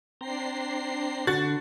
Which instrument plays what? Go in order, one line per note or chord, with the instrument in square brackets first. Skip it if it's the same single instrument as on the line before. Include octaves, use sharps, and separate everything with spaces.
[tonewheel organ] C4 G5 A#5 [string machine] D4 C7
[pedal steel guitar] D3 [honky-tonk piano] F#4 A6